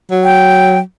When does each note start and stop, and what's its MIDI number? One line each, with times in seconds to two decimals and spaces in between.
0.11 0.80 54
0.24 0.79 79